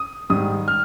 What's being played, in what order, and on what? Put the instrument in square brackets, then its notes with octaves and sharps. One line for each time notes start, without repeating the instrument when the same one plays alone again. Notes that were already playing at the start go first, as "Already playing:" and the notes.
Already playing: [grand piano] D#6
G#2 D#3 G3 D#6
F6